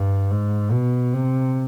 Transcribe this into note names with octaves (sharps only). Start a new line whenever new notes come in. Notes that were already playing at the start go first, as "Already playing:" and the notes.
Already playing: G2
G#2
B2
C3